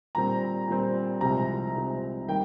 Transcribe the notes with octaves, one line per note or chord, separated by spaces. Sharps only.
A#2 G3 C4 A#5
A#2 G3 C4
C2 C3 F3 G#3 C4 A#5
C2 C3 F3 G#3 C4
D#3 G3 A#3 G5